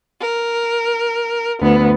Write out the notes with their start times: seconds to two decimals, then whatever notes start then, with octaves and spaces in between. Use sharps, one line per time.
0.19 A#4
1.60 D2 B3